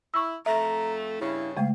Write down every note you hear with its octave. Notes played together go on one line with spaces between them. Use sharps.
E4 C#6 E6
F2 A3 E5 A#5
G2 C#3 E4
C#3 G#3 A3 F5